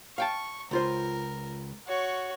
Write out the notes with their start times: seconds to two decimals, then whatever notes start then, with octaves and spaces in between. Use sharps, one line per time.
0.18 F5 G5 A5 C#6
0.71 C#2 F4 A#4 C5
1.87 F#4 C#5